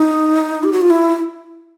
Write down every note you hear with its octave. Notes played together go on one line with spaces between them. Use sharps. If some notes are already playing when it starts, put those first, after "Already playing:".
Already playing: D#4
G4
F#4
F4
E4